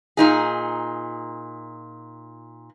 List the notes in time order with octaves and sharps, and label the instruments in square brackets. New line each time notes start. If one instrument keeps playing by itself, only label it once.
[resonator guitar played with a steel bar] A#2 D#4 G#4